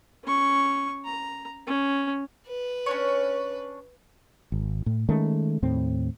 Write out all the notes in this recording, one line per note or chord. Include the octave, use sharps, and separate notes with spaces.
C#4 C#6
A#5
C#4
B4
C#4 D4 C#5
G#1
A2
D#3 G#3 A3 C#4
D#2 A2 C4